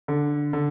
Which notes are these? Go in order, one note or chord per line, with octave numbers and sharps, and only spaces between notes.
D3
D3